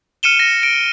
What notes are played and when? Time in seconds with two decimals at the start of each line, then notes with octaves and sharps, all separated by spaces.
0.23 F6 C#7 D#7 E7 G7
0.40 A#6
0.63 D7